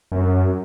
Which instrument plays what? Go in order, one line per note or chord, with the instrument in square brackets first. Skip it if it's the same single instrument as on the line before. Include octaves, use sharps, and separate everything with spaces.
[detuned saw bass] F#2